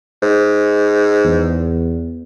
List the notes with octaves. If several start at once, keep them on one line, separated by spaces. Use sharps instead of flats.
G#2
E2